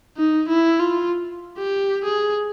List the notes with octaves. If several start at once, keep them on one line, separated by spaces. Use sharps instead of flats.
D#4
E4
F4
G4
G#4